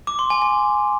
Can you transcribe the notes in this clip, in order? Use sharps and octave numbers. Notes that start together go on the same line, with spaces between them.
D6
C6
G#5
G#5